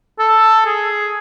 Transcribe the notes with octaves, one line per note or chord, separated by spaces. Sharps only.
A4
G#4